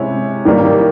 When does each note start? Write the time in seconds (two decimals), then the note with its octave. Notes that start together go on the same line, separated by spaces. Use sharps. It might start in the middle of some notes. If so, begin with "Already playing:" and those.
Already playing: C3 G#3 C#4 E4
0.45 D#3 G3 A#3